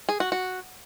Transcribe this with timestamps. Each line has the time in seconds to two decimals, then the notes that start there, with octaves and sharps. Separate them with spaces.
0.09 G#4
0.20 F#4
0.32 F#4